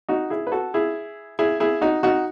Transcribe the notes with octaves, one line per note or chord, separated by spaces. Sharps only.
D#4 F#4
E4 G#4
B4
F#4 A4
E4 G#4
E4 G#4
E4 G#4
D#4 F#4
D#4 F#4